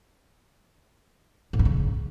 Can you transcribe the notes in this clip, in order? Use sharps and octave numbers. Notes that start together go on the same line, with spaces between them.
A2
G2
C#3